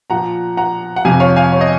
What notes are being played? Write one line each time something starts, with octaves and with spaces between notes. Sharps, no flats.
A#2 F3 F#5 A#5
F#5 A#5
F#5
F2 C3 F3 F5 G#5
C#5 F5
F5 G#5
C#5
D#5